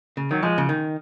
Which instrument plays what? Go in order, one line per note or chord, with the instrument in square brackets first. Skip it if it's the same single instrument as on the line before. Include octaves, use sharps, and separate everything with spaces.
[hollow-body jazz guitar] C#3
[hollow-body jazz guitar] D#3 [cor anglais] F#3
[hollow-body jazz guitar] F3 [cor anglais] G#3
[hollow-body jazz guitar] C#3
D#3